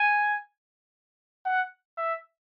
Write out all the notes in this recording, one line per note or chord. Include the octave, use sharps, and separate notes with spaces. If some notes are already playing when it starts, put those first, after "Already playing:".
Already playing: G#5
F#5
E5